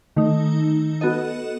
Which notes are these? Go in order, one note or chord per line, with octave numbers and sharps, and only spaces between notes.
D#3 A3 D#4
B3 F#4 A4 D#5